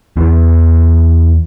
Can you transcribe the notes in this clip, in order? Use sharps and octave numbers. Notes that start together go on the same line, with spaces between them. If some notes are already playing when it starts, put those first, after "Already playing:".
E2 B3